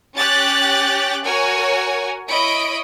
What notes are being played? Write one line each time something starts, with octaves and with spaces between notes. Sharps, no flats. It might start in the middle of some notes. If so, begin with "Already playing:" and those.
C#4 G4 G5 F#6 A6
F#4 A#4 C#5 G#5
E4 C#5 D#5 B5 D7